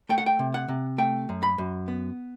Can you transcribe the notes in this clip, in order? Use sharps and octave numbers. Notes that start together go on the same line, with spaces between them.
A3 G5
F#5
G5
C3
F#5
C3
A3 G5
F#2
B5
F#2
B3